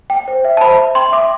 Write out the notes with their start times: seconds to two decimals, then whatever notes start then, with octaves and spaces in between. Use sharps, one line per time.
0.10 G5
0.28 C5
0.45 E5
0.57 A5
0.61 C5 B5
0.78 E5
0.95 G5 C6
1.12 E5 D6